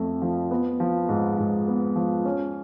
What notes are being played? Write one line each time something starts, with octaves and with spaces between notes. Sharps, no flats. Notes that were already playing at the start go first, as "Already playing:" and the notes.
Already playing: F2 F3 A3
F3
B3
F3
G#2
G#2
B3
F3
C#4